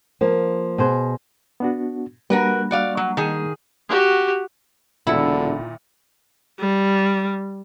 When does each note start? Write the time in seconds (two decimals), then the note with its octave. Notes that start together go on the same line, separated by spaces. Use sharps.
0.21 F3 A#3
0.78 B2 G#4 C5
1.60 B3 D4 F#4
2.30 G3 A#3 D4 F#4 A#4 B4
2.71 F#4 D5 F5
2.97 F#3
3.17 D#3 G#4
3.89 F#4 G4
5.07 E1 A#2 D3 D#3 E4 C#7
6.60 G3